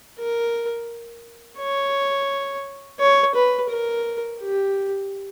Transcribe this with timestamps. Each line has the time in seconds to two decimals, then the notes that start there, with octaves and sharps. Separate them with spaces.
0.19 A#4
1.59 C#5
3.00 C#5
3.35 B4
3.70 A#4
4.40 G4